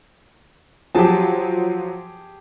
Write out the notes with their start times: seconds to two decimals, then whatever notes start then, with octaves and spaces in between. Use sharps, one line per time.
0.95 F3 F#3 G4 G#4 A5